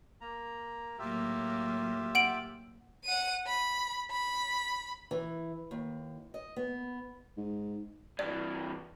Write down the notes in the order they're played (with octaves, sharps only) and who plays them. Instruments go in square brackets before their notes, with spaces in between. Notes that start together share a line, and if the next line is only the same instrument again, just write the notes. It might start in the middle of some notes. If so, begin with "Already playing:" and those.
[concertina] A#3 A#5
[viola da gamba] A2 F#3 A#3 [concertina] F4 G4 E5
[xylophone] F#5 D7 F#7
[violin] F#5 D#7
B5
B5
[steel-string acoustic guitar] E3
D#2
D#5
B3
[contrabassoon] G#2
[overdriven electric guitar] G2 E3 [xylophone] D5